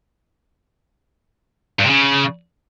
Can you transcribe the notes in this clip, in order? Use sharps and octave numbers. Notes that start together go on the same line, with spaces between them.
G2
C3
C#3